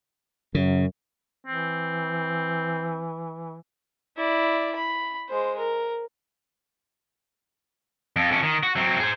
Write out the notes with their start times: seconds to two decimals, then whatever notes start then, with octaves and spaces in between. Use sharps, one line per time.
0.55 F#2 C#3
1.47 E3 C4
4.17 E4 D5
4.75 B5
5.29 G#3 C5
5.58 A#4
8.16 F2
8.31 F2 C#4
8.43 D#3
8.63 F#4
8.76 F#3 C4
9.00 G#4 C5